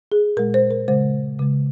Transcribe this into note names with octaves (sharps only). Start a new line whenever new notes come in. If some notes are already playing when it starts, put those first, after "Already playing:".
G#4
A#2 G#3 A#4
C5
A#4
C#3 G#3 C5
C#3 G#3